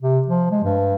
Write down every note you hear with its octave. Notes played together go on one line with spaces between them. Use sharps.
C3
F3
G#3
G2